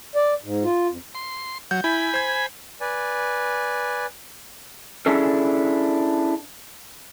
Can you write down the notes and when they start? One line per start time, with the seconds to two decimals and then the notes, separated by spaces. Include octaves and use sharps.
0.15 D5
0.43 G#2
0.64 F4
0.90 F2
1.15 C6
1.71 F#3 G6
1.84 E4 G#5 B5
2.14 C5 G#6
2.81 B4 D5 G#5
5.06 C#4 D4 E4 G#4 A4